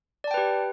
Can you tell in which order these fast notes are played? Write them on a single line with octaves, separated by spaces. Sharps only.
D5 A5 G5 B4 G4